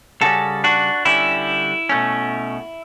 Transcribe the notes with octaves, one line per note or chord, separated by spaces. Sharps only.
C#3 G3 C#4 F#4 A4
D4 F#4
D3 G3 C#4 E4
B2 A3 C#4